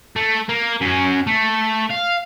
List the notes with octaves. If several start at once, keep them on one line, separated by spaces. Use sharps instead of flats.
A3
A#3
F#2 C#4
A3
F5